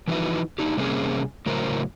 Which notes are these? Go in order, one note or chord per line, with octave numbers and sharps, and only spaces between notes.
E3 F3 D#4 E4 F#4 B4
D4 D#4 G4
C3 G3 A#3 C4 C#4 G#4
A2 C#3 F#3 A#4 C5